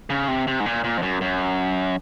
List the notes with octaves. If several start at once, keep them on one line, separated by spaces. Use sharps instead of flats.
C#3
C3
C3
G#2
A#2
A#2
F2
F#2
F#2